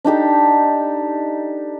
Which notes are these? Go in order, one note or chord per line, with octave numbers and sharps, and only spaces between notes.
D4 D#4 G4 A4